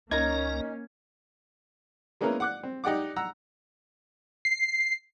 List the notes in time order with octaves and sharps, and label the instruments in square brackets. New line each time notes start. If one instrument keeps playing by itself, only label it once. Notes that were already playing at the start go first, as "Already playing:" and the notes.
[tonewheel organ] C#2 A#5 [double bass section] A#3 C#4 [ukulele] D#4 A#4 [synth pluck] G#6
[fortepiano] G#3 A#3 B3 C#4 E4 A#4
F#5 D6 F#6
C4
D#4 G4 D5 F#5 D6
F#5 A#5 E6
[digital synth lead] C7